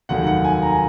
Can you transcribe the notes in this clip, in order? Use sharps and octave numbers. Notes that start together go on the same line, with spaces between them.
F1 D#2 D#3 F#3 F#5
F#5
G#5
A#5
G#5